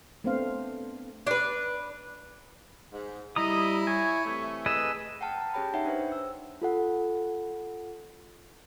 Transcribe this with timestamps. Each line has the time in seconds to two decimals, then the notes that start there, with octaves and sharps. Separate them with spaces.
0.24 A3 B3 C4 D4 C5 F5
1.27 D4 B4
2.92 G#2
3.36 G3 E4 D#5 A#5 D#6
3.87 C#5 G#5
4.25 C3 E3 A3
4.66 G#4 B4 D#5 E6
5.21 F#5 G5 A5 F6
5.37 A5 A#5
5.54 C#4 G4 G#4 C#5 G5 B5
5.74 D#4 C#5 E5 F#5 G5
5.85 D4 B4 C5
6.12 E6
6.62 F4 A4 F#5